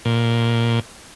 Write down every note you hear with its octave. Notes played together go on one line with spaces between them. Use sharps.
A#2